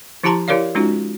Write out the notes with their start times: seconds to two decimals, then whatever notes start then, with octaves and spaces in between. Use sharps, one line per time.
0.23 F3 E4 G4 A5 A#5 C6
0.48 E4 G4 A#4 C#5 D5 F5
0.75 G#3 C#4 D#4 F4 F#4